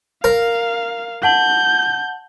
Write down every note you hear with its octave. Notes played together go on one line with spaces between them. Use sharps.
A#4 F5
F#5 A5 G6 F#7